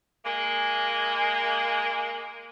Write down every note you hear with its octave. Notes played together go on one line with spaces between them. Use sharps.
G#3 A#3